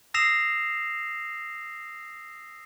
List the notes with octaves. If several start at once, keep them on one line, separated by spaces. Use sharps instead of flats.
D#6 E6 A#6 C7 E7 F7